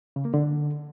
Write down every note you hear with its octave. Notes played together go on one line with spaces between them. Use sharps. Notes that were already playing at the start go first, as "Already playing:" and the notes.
C#3
A#3
D3